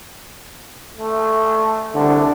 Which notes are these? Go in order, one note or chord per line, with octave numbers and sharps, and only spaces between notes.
A3
C2 D3